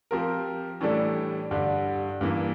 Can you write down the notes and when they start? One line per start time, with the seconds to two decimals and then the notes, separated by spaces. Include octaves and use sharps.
0.11 F3 C4 G4 A#4
0.81 A2 E3 G3 D4 A4
1.51 G2 D3 G3
2.21 G2 E3 A#3